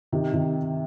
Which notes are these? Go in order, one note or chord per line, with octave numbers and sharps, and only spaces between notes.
C3 D#3
C3 D#3